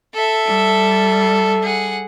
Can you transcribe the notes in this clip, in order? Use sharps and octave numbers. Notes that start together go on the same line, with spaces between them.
A4 E5
G3
G#4 F#5